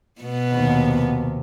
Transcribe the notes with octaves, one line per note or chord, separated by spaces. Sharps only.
B2 B3
D#2 C3